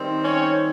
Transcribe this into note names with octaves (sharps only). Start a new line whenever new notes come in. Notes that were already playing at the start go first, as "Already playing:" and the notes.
Already playing: D#3 G3 C4
C#4 C#5